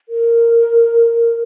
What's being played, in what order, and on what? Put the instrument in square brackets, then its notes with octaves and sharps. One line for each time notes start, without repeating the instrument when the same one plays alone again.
[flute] A#4